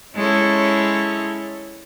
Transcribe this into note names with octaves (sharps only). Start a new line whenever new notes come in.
G#3 C#4 E4 A4 C#5